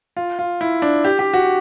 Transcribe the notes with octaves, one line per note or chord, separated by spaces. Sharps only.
F4
F4
E4
D4
G4
G4
F#4